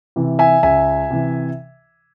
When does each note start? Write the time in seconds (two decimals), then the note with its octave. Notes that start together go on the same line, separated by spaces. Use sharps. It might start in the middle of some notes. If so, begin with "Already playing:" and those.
0.16 C3 E3
0.39 E5 G#5
0.63 C#2 E5 G#5
1.10 C3 E3